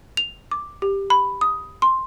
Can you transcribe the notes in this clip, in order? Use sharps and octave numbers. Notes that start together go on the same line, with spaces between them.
F7
D6
G4
B5
D#6
C6